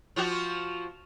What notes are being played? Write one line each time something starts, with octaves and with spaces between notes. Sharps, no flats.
F3 F4 F#4